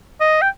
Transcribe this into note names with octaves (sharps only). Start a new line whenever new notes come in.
D#5
G5